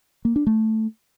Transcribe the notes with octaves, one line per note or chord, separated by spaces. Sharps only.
A#3
D4
A3